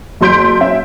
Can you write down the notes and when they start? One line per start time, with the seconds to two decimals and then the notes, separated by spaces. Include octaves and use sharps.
0.21 F#1 F#3 C6 G6 B6 D7
0.61 C#4 E5